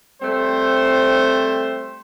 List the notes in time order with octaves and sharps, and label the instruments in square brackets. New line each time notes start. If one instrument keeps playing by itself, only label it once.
[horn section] G3 A3 C4 C5